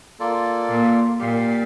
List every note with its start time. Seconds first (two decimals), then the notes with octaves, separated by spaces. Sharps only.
0.19 A#3 F4 A4 D5
0.69 A#2
1.19 A#2 G4 D5 F5